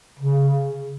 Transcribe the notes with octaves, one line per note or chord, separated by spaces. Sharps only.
C#3